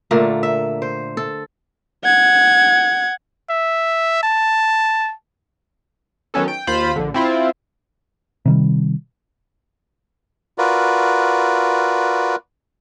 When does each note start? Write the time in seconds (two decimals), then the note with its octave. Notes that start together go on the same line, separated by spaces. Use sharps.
0.11 A#2 D3 A3 A#3
0.43 E5
0.82 C5
1.17 A4
2.04 F#5 G#6
3.50 E5
4.23 A5
6.34 D#3 F#3 B3 C#4 A4
6.48 G5
6.67 D#2 F4 C5 B5
6.96 A#1 D3
7.14 C4 E4 F4
8.45 C3 D#3 G3
10.58 F4 F#4 A#4 B4 D5